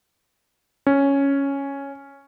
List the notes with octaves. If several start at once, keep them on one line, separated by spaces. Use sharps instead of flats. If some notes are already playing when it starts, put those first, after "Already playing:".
C#4